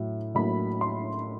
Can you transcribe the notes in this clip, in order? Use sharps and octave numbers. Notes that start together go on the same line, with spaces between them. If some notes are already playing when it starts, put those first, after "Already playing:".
Already playing: A2 F#3
A2 F#3 A#3 B5
C6